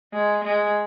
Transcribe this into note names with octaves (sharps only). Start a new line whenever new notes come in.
G#3
G#3